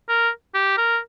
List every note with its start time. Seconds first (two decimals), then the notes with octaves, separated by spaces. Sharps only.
0.09 A#4
0.55 G4
0.78 A#4